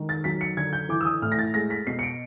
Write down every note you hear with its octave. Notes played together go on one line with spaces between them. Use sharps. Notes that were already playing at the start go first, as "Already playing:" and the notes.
Already playing: D#3 G#3
A6
F#3 B6
C#7
D3 G#6
G6
E3 D6
E6
D#6
A2 F6
A#6
A6
G#3 A#6
B6
B2 C7
C#7
D7